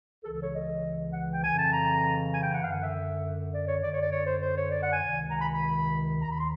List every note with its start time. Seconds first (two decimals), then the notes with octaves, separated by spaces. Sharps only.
0.22 C#2 C#3 E3 A4
0.33 A4
0.42 C#5
0.52 D#5
1.12 F#5
1.32 G5
1.42 F2 C#3 E3 G#5
1.57 A5
1.72 A#5
2.32 G#5
2.41 G5
2.51 F#5
2.61 F#2 D3 F5
2.72 F#5
2.81 E5
3.52 D5
3.66 C#5
3.81 F#2 D3 D5
3.93 C#5
4.01 D5
4.11 C#5
4.26 C5
4.41 C5
4.56 C#5
4.71 D5
4.81 F#5
4.91 G#5
5.00 C#2 C3 D#3
5.30 A#5
5.40 B5
5.51 B5
6.20 D#2 D#3 A#5
6.30 B5
6.39 C6